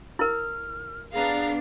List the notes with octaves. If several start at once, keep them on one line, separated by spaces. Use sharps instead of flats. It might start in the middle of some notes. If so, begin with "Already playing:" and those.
E4 A#4 F6
B3 D4 G#4 F5 A#5